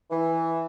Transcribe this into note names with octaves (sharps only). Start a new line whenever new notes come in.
E3